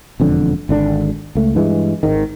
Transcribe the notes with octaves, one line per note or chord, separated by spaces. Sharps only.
E1 F2 D3
G#1 D3 D4
C#2 A3
G2 E3 G#3
G#1 G#2 D#3